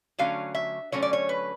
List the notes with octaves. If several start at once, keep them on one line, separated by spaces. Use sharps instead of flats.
D3 F#3 A3 C#4 F5
E5
D3 F#3 A3 C#4 C#5
D5
C#5
B4